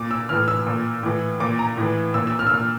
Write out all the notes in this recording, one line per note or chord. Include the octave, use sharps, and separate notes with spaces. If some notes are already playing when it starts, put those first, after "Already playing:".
Already playing: A#2 D6
E6
A2 E3 F6
E6
A#2
A2 E3
A#2 D6
A#5
A2 E3
A#2 E6
E6
F6
E6
A#2 F6